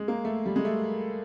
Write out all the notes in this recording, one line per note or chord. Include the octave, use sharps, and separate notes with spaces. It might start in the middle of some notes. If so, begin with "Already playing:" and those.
Already playing: G#3
A#3
A3
G3
G#3
A3